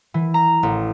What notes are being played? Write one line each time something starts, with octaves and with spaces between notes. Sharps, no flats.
E3
A#5
A1